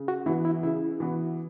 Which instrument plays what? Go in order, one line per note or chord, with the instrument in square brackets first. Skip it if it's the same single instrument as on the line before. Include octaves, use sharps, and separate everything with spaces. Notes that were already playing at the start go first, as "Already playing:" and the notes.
Already playing: [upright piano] C#3
[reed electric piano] F#4
[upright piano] E3 B3 F#4 [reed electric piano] E4
[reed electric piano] E4
[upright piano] C#3 [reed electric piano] E4
[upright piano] E3 B3 F#4